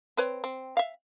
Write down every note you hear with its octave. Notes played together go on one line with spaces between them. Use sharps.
C4 B4 C#5
C4
E5 F5